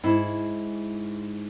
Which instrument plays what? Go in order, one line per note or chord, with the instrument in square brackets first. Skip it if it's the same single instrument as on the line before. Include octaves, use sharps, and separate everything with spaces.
[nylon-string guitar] G#2 E4